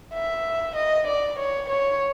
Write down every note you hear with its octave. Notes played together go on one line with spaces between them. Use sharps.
E5
D#5
D5
C#5
C#5